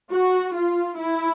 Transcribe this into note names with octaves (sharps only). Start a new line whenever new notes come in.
F#4
F4
E4